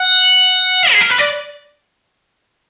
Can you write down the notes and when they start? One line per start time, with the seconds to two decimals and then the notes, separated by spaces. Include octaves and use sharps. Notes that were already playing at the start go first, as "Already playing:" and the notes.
Already playing: F#5
0.92 G#4
1.01 A#4
1.10 B4
1.19 D5